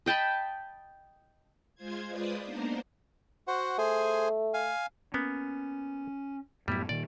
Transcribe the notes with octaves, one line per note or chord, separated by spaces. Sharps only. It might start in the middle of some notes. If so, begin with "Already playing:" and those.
D#5 G5 A5 B5
G#3 F4 C5 G#6
G#3 F4 B4 C5 D5 D#6
A#3 B3 D4 D#4 A#4 C5
F#4 C5 F#5
A3 G#4 C5 G#5
F5 G#5
A#3 B3 C#4
F#2 A2 G3 B3 E4
A#2 D#3 D5